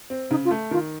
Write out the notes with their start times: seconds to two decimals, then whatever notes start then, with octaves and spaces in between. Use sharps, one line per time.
0.10 C4
0.30 C#3 D#4
0.45 F4
0.51 A3
0.71 D#3 F4